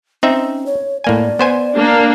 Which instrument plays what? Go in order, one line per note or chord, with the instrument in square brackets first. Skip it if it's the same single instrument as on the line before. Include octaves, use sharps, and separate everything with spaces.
[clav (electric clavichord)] C4 D#4 E5 [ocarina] C#4
[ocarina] C#5
[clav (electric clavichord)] A2 A#3 G#5 [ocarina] D5
[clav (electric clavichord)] B3 C5 G#5
[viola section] A#3 D4